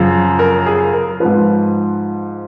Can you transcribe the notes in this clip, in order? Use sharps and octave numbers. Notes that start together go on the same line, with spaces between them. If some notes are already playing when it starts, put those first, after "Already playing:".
Already playing: F#2 C#3 F3
A#4
G#4
A#4
G#2 F3 B4